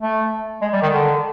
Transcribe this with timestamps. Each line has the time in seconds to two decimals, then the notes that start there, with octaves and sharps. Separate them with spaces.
0.01 A3
0.62 G#3
0.73 G3
0.83 D#3
0.93 D3